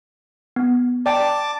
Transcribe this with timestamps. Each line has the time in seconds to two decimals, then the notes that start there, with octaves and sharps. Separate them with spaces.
0.56 B3
1.06 D5 G5 A5 A#5 D6